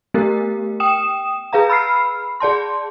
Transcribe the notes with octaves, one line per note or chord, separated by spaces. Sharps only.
A3 B3 G4 A#4
G5 D#6 E7
G#4 B4 F5 A#5
B5 E6 F6 C7
G#4 D5 A5 C6